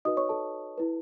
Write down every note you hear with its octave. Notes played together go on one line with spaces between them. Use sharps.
D#4 F#4 B4 D#5 D#6
C#5 C#6
A4 A5
E4 B4